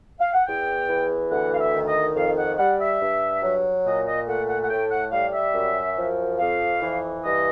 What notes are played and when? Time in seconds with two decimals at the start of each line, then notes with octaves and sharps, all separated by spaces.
0.20 F5
0.33 F#5
0.46 E2 G5
0.90 E3
1.31 D2 F#5
1.53 F5
1.60 E5
1.73 D#3
1.88 D#5
2.15 F2 F5
2.37 F#5
2.58 G3 F#5
2.80 E5
3.01 G2
3.43 F#3
3.85 A#2 D#5
4.06 D#5
4.28 A3 F#5
4.49 F#5
4.63 F#5
4.69 A2 G5
4.90 F#5
5.12 G3 F5
5.34 E5
5.54 F#2
5.97 F3
6.39 F2 F5
6.82 E3
7.23 G2 D#5